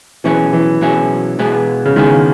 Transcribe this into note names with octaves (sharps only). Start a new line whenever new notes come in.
B2 E3 F#3 C#4 E4 G#4
E3
B2 F#3 C#4 E4 G#4
B2 G#3 B3 E4 G#4
C#3
B2 D#3 G#3 B3 E4 G#4